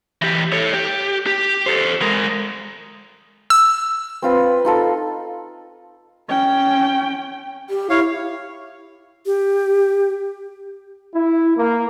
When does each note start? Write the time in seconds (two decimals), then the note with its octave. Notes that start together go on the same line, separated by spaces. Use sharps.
0.22 E3 G4
0.52 A4 C#5
0.74 G4
1.27 G4
1.66 A4 C5
2.02 G#3 A#4
3.50 E6
4.22 C4 F4 B4
4.65 D#4 F4 A4
6.28 C#4 G5
7.70 G4
7.90 E4 C#5 F5
9.26 G4
11.15 E4
11.57 A#3